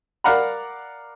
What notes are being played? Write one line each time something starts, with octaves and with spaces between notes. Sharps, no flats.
A#4 D5 F5 F#5 A#5 B5